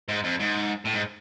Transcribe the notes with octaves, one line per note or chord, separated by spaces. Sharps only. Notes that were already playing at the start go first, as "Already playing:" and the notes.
G#2
F2
G#2
A2
G#2